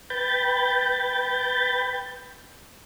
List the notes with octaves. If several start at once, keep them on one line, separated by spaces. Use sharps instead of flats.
B4 G5 B5 G6 A6